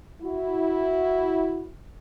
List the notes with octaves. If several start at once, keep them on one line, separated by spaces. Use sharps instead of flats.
E4 F#4